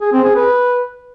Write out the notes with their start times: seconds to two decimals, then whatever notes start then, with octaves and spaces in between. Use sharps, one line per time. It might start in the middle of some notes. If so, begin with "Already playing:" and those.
0.01 G#4
0.13 C4
0.24 G#4
0.36 B4